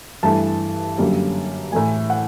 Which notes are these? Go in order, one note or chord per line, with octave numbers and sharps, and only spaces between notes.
G2 E3 A3 A5
F#2 D3 G3 A#3
A2 E3 A3 G#5
F#5